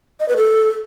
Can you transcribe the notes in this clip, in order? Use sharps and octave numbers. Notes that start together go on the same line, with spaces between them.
D#5
B4
A4